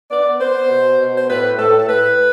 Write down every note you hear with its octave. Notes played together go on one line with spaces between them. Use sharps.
B3 D5
B3 C5
B2
B2
C5
A2 B4
A2 A4
A4
A2 B4